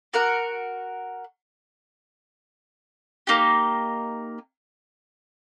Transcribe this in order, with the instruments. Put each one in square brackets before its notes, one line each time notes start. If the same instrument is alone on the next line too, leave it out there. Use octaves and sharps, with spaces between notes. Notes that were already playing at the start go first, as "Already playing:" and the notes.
[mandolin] F#4 A#4 F#5
A#3 D#4 G4